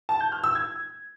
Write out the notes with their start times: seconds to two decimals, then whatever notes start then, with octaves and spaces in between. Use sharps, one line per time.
0.09 A5
0.20 G6
0.32 F6
0.44 E6
0.55 G#6